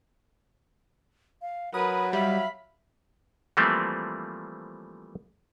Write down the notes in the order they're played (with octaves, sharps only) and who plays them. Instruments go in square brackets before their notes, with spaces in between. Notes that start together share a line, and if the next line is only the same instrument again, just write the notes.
[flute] F5
[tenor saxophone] F#3 [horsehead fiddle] A#4 B4 [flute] B5 [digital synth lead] D#6
[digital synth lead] G3 [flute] E5 [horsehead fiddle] F5 B5
[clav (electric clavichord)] E3 F3 G3 A3 A#3 C4